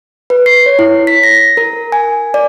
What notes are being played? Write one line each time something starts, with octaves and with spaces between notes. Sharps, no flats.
B4
C7
C#5
E4
B6
A#6
A#4
G#5
D5